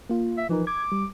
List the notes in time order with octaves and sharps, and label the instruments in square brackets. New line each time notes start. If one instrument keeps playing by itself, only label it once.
[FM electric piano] A#3 F4
[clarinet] E5
[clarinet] E3 [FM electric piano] F3 D#4 A#4
[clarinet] D6 [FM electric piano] G#6
[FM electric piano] G3